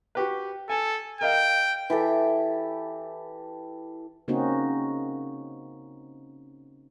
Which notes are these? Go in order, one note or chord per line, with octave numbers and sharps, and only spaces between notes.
F#4 G4 B4
A4 G#5
A#4 D#5 F5 G5
E3 G4 A4
C#3 A#3 C4 C#4 D#4 F#4